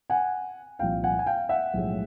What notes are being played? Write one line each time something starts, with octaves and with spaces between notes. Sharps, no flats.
F#5 G#5
C2 A#2 F3 F5 G5
F#5 G#5
G#5
F5 G5
E5 F#5
B1 A2 F3 G#3